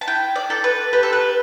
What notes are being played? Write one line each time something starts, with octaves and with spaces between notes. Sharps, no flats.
A5
E4 G5
D5
A4
B4
G4 B4
A4
B4